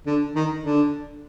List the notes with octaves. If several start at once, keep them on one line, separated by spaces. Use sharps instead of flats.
D3
D#3
D3